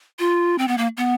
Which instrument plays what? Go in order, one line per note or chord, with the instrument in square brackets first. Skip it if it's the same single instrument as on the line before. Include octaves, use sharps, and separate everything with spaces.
[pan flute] F4
C4
B3
A#3
B3